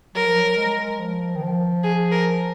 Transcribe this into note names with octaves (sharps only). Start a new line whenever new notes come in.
F#3 A#4
F3
F#3
G#3
F3
D#3
F3
G#4
A#4